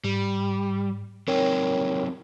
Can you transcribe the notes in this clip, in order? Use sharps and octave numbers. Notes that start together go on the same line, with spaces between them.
G#2 G3
F#3 C4 D#4 A#4 C#5 G5